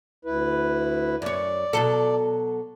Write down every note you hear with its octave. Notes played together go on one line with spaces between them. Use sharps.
D2 E4 B4
F#2 C#5 D5
B2 F#3 A4